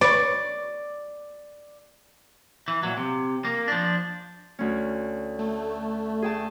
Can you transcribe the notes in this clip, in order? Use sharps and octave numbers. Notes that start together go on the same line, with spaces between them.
B4 C#5 D5 C#6
E3
A#2 F#3
C3
A#3
F3 D4
D2 C#4
A3
G#4 G5 A5